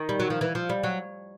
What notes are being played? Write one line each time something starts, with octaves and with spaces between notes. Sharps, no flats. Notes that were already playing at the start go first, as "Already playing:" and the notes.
Already playing: D#3
G3
F#3
F3
E3
F3
G3
F#3